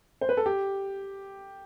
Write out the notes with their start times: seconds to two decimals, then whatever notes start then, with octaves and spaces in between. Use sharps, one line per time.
0.21 C5
0.29 B4
0.37 A4
0.46 G4